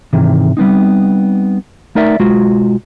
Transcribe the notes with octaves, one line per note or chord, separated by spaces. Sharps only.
G#2 C3 D#3 E3
G3 B3 C4 D#4
A3 D#4 A#4 D5 E5
B1 G#3 F4 F#4